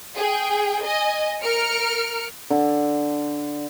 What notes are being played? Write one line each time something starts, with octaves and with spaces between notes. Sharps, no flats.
G#4 G5
D#5 G#5
A#4 F6 C#7 D7
D3